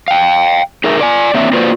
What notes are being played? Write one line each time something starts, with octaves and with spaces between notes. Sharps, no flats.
F5 G5
D#4 G#4 A#4 E5
D5 G#5
A#3 C4 D4 C#5 E5
A#3 F4 F#4 B4 C5 D5